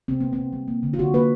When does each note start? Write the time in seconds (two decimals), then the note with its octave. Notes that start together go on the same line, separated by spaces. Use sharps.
0.08 C3 C4
0.20 A#3 B3
0.33 C4
0.38 C3
0.53 G3
0.68 A#3
0.83 D3
0.93 F4
0.99 D3 F#4
1.14 A#3 B4